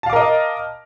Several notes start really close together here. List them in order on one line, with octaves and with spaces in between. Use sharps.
A5 F5 D6 A#4 D#5